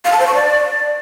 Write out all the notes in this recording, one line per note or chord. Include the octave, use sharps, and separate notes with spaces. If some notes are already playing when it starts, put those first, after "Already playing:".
F5
A5
C5
C#6
D5